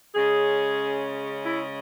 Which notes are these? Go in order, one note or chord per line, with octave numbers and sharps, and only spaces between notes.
C#3 G#3 C#4 G#4
E4